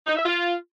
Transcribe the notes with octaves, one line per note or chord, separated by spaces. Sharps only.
D#4
E5
F4